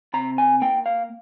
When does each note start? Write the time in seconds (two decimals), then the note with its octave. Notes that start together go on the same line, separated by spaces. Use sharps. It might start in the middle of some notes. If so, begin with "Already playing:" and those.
0.14 C3 A#5
0.38 G#5
0.61 A#3 G5
0.86 F5